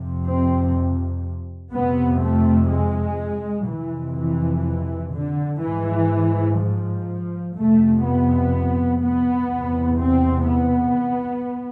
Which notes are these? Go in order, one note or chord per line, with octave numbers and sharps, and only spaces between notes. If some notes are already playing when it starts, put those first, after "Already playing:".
Already playing: F2 C3
C4
F2 C3 B3
A3
G#3
F2 C3 E3
E3
D3
G#2 E3
F3
F2 C3 A3
B3
B3
E2 C3
C4
B3